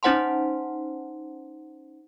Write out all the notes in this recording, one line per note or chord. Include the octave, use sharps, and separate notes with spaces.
C#4 D#4 C5 F#5 A5 C6